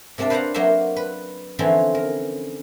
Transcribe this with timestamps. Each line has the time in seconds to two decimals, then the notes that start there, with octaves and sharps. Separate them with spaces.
0.18 C3 A#3 C4 D4 D5
0.30 B4 C5 D5 F5 F#5 A#5
0.54 F#3 A#3 F#4 A#4 C5 E5
0.96 B4
1.59 D3 E3 F3 C4 C#4
1.95 A#4